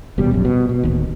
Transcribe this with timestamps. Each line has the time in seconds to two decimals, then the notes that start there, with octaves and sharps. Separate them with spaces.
0.18 D#1 B2 G3
0.31 A#1 F#2
0.45 B2
0.69 B2
0.83 D1 D#2